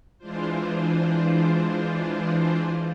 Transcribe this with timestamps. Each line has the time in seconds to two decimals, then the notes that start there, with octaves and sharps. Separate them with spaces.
0.19 E3 G#3 D4 F4 C5